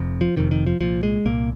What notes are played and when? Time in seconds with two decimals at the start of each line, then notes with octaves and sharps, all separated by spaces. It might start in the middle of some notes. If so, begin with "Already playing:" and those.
Already playing: F1 F2 C3
0.21 F3
0.36 F1 F2 C3 D#3
0.51 D#3
0.67 F3
0.80 C2 A#2 F3
1.03 G#3
1.25 C2 A#2 A#3